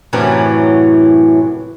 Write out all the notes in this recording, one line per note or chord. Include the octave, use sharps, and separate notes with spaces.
F#2 A2 C3 E3 F#3 C#4